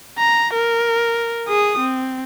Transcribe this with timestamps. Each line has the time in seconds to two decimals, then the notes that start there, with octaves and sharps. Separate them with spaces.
0.19 A#5
0.54 A#4
1.48 G#4 D#6
1.79 C4